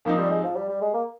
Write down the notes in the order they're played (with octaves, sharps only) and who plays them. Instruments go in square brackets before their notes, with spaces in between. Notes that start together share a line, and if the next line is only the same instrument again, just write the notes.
[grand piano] G#2 F3 C4 D#4 [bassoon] A#3
[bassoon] G3
G#3
F3
G3
G3
G#3
A#3